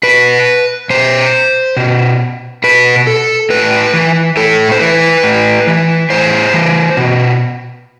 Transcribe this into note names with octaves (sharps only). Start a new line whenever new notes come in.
B2 B4
B2 C5
B2
B2 B4
A4
A2 B4
E3
A2 A4
C5
E3 B4
A2
E3
A2 C5
E3
B2